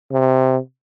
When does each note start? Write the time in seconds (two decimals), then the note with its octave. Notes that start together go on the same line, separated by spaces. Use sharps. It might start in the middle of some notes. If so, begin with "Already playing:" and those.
0.11 C3